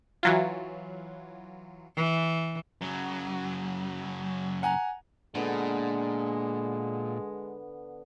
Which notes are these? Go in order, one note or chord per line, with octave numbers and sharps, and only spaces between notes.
E3 F#3 F4
E3
F#2 C#3 F#3
F#5 G#5 A#5
A#2 D3 G#3 B3